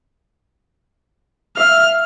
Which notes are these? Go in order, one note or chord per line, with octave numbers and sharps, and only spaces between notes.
E5 F5 F6